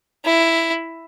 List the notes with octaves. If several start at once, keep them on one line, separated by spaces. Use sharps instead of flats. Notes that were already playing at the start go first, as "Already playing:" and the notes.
E4